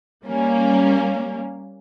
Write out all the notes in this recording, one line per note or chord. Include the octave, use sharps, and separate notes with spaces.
G3 A#3 C#4